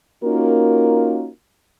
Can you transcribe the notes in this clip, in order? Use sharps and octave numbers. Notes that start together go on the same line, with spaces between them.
A#3 C#4 D#4 F4 F#4 A#4